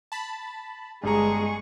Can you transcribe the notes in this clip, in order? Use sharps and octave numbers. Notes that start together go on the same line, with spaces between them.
A5 B5
G1 G2 G#3 G#4 A#5 C#6